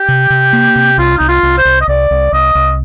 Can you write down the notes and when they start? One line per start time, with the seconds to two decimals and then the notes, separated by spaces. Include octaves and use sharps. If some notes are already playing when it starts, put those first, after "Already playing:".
Already playing: G4
0.08 C3
0.30 C3
0.53 A#3
0.76 C3
0.98 C2 F4
1.18 C2 D#4
1.28 F4
1.43 C2
1.58 C5
1.65 C2
1.81 D#5
1.88 C2 D5
2.11 C2
2.32 C2 D#5
2.55 C2